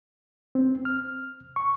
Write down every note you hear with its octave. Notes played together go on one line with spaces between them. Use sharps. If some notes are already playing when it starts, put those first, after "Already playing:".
C4
F6
C#6